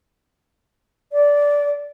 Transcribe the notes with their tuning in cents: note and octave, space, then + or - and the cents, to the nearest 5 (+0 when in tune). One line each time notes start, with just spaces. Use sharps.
D5 -15